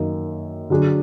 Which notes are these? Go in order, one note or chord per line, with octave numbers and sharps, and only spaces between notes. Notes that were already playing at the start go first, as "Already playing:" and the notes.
Already playing: F#2 D#3 A#3 D#4
D3 F#3 D4 G#4